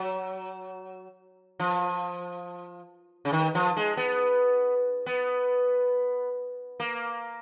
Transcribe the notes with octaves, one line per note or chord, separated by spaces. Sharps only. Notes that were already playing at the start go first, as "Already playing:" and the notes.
Already playing: F#3
F3
C#3
D#3
F3
G#3
B3
B3
A#3